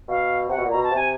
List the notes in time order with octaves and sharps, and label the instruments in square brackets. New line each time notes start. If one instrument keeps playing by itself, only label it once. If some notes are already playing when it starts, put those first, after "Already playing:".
[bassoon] B2 [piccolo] F5
[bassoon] C3 [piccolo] F#5
[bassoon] B2
A#2
[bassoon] B2 [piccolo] A#5
[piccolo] A5
[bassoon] C3 [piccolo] G#5